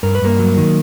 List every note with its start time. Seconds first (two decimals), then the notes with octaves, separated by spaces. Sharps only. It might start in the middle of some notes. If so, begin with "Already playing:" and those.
0.03 G2 A#4
0.15 B4
0.22 G2 A#3 A#4
0.39 F#3
0.57 D#3